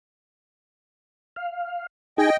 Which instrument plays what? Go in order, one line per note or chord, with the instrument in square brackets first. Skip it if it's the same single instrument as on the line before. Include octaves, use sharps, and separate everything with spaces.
[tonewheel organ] F5
[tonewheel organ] D#4 G#4 G#5 [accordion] D#5 G5